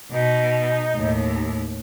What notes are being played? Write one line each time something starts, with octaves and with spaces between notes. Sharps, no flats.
B2 D#4
D#2 A2